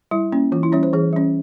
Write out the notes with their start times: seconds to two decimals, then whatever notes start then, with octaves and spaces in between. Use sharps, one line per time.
0.11 G3 E4
0.32 A#3 C#4
0.52 E3 F4
0.63 E4
0.72 G3 C#4 C#5
0.83 C5
0.93 E3 G#4
1.13 G3 C#4